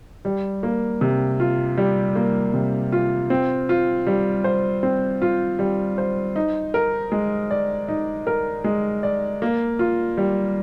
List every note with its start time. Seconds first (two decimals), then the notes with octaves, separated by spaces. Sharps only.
0.25 G3
0.63 A#3
1.01 C3
1.40 F4
1.77 G3
2.15 A#3
2.54 C3
2.92 F4
3.30 C4
3.69 F4
4.07 G3
4.44 C5
4.83 C4
5.22 F4
5.59 G3
5.98 C5
6.36 D#4
6.74 A#4
7.12 G#3
7.51 D5
7.88 D#4
8.27 A#4
8.64 G#3
9.03 D5
9.42 A#3
9.79 F4
10.17 G3